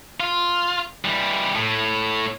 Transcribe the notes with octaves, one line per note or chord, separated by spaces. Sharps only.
F4
E3 G3
A2